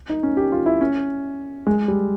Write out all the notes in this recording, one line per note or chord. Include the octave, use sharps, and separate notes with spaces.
D#4
C#4
G4
F4
E4
C#4
G#3
G3